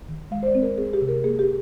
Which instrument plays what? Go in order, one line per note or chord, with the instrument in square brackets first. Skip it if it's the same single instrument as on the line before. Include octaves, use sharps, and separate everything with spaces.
[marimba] D#3
G#3 F5
C5
D5
C4
A#4
C4 G#4
G4
C3
A#4
A#3 G#4
G4